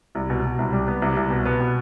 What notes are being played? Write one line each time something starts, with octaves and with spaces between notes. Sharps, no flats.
C2
B2
B2
C2
G3
B3
C2
C2
B2
B3
B2